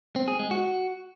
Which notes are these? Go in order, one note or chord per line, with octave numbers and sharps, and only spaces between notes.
C4
G#4
G#3
F#4